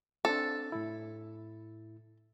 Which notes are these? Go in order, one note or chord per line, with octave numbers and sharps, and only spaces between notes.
C4 D4 A4
A2 E4